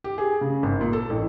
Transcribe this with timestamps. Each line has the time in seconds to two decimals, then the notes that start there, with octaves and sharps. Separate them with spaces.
0.04 G4
0.18 G#4
0.41 C#3
0.63 G#1
0.81 A#2
0.93 A4
1.10 A1